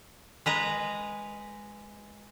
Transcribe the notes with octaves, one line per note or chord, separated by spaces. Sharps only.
G#3 B4 A#5